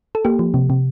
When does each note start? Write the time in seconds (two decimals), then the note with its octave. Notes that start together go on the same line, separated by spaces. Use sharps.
0.15 A4
0.25 A#3 G4
0.39 F3
0.54 C3
0.70 C3